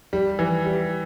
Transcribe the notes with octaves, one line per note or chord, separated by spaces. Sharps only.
G3
E3
G3